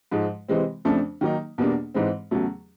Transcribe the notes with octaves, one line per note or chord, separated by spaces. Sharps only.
G#2 F3 G#3
C3 E3 G#3 C4
F2 C#3 F3 A3 D4
D#3 F#3 A#3 D#4
E2 B2 G3 A#3 D4
G#2 E3 G#3 C4
E2 C#3 F#3 A3